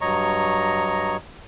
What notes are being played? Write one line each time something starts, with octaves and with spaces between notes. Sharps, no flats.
G2 F#3 C#5 D#5 A#5 C#6